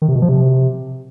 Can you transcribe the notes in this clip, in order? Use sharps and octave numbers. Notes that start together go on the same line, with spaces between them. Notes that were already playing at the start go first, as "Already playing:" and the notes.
D#3
C3
B2
F3
C3